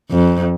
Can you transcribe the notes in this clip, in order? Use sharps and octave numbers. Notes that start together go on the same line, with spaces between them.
F2